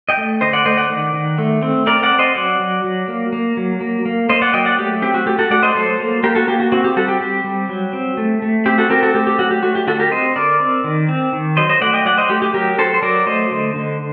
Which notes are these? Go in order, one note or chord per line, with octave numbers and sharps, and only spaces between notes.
D#5 G5
A3
D3 C5 D#5
D5 F#5
A3 C5 D#5
D5 F#5
D#3
D#3
A3
C4
C4 A#4 D5
D5 F#5
C4
C5 D#5
F#3 D5 F#5
F#3
F#3
A#3
A#3
F#3
A#3
A#3
A#3 C5 D#5
D5 F#5
F#3 D#5 G5
D5 F#5
A3 G4
C4 G4
F#4
A3 G4
F#4 A4
A3 D5 F#5
C5 D#5
F#3 A4 C5
A#3
A#3 G4 A#4
F#4 A4
A#3 G4
F#4
C4 F#4
G4
G3 F#4 A4
G4
C4 G4
G3
F#3
C4
A3
A3
C4 G4
F#4 A4
C4 G4 A#4
F#4 A4
A3 G4
G4
F#3 F#4
G4
A3 F#4
G4
D3 F#4 A4
G4 A#4
C4 C5 D#5
D3 A#4 D5
C4
D#3
C4
D#3
F#3 C5 D#5
C5 D#5
A3 D5 F#5
D#5 G5
F#3 D5 F#5
C5 D#5
A3 G4
G4
F#3 G4 A#4
F#3 A4 C5
C5
F#3 A#4 D5
A3 C5 D#5
D3
D3